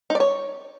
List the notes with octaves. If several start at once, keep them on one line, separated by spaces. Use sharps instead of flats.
D#4
D5
C#5